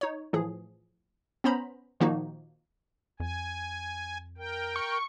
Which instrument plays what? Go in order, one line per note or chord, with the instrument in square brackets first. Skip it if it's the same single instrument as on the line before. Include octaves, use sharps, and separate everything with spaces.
[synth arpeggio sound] D#4 C#5
A2 E3 F3 G#4
B3 C#4 C5 A#5 B5
A#2 D#3 F3 A#3 D#4 F#4
[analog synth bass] F2 [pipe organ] G#5
[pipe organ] A#4 G5
[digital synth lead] C#6